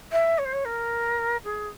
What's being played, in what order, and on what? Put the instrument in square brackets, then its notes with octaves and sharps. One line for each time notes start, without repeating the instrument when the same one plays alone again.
[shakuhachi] E5
C#5
C5
C#5
A#4
G#4